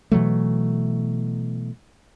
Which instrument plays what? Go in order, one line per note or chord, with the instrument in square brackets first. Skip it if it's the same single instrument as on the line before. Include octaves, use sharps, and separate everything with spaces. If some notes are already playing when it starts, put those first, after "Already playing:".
[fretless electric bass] B2 E3 F#3 A3